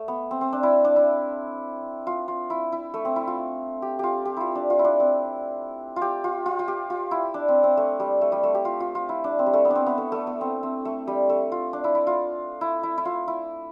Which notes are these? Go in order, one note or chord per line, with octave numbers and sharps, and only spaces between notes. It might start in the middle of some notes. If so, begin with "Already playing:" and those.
Already playing: A3
B3
C4
C4
D4
E4
D4
E4
F4
F4
E4
E4
A3
C4
E4
F4
G4
F4 G4
G4
E4 F4
D4
F4
E4
D4
C4
F4
G4
F4
F4
F4
G4
F4
E4
D4
C4
C4
A3
G3
A3
G3
A3
G4
F4
F4
F4
E4
D4
C4
G3
A3
B3
D4
C4
B3
A3
A3
B3
C4
C4
A3
G3
A3
F4
D4
E4
E4
F4
E4
E4
E4
F4
E4